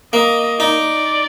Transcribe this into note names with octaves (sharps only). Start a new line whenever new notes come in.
A#3 D#5
D#4 D5